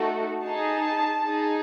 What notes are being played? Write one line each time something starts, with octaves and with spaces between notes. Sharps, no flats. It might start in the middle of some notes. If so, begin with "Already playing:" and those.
Already playing: A3 D#4 F#4 A4
D#4 G#4 A5
D#4 G#4